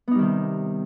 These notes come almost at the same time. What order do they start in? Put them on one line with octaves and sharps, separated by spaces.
B3 D#4 G3 D#3 C3